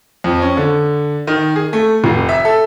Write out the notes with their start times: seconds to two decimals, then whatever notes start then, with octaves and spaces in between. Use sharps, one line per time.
0.24 F2
0.42 C#4
0.57 D3
1.27 D#3
1.56 G#4
1.73 A3
2.04 F1
2.29 E5
2.45 A4